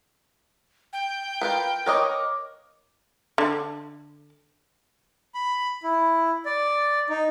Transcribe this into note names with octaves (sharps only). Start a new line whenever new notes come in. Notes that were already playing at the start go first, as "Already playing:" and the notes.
G5
F4 A#4 B4 F5
A#4 B4 C#5 D#5 D6
D3
B5
E4
D5
D#4